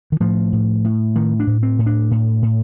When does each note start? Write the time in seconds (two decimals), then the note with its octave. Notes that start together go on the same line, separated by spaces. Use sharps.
0.12 D#3
0.20 A2 F3
0.53 A2
0.84 A2
1.15 A2 D#3
1.40 D4
1.47 A2
1.63 C4
1.79 A2
1.86 D4
2.11 A2
2.42 A2